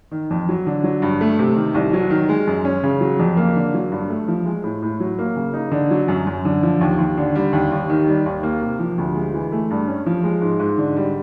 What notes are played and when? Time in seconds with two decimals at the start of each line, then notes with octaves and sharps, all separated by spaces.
0.11 D#3
0.30 F2
0.49 F#3
0.66 D3
0.84 F#3
1.02 G2
1.21 A3
1.39 C3
1.56 D#3
1.75 C2
1.93 F#3
2.10 D#3
2.29 G#3
2.47 F#2
2.65 C#4
2.83 C#3
3.01 F#3
3.19 F2
3.37 A#3
3.56 D3
3.74 F#3
3.92 G2
4.10 A3
4.28 F3
4.46 G#3
4.64 A2
4.82 A2
5.00 F#3
5.19 A#3
5.36 C#3
5.54 D#4
5.72 D3
5.91 F#3
6.08 F#2
6.27 F#2
6.45 D3
6.63 F3
6.81 D#2
6.99 D#2
7.17 D3
7.35 G3
7.53 D#2
7.72 D#2
7.90 D#3
8.08 G3
8.26 D#2
8.43 A#3
8.61 C3
8.79 F3
8.98 D2
9.15 G#3
9.34 E3
9.52 A3
9.70 G2
9.87 C#4
10.06 F3
10.24 G#3
10.41 G#2
10.60 G#2
10.78 D3
10.96 G3